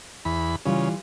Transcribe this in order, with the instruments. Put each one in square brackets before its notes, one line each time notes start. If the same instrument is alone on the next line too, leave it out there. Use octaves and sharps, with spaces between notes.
[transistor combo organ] E2 B5
[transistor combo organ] C#3 [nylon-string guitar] E3 G3 F4